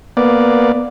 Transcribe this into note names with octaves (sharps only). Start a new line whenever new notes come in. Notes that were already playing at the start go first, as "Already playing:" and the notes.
A#3 B3 D5